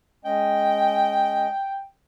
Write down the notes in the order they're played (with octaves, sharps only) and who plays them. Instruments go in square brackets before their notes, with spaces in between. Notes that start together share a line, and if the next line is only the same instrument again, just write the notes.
[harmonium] G#3 C#4 D#5 [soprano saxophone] G5